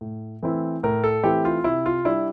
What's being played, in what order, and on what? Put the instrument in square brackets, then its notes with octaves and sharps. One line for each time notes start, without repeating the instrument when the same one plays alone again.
[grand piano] A2
E3 A3 C4 E4
A2 A#4
A4
E3 A3 C4 E4 G4
F4
C3 E4
F4
G3 D4 E4